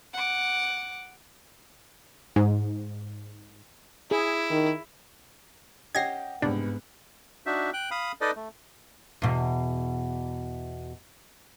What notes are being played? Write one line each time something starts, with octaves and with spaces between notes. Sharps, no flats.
F#5 D6
G#2
E4 G#4
D#3
C#4 G4 D#5 F#5 G5 G#6 A#6 C7
C2 G#2 B3 D4
D4 D#4 F#4 E5
G5 F#6
F5 B5 D#6
D#4 A4 B4 D5 D#5
A3
E2 B2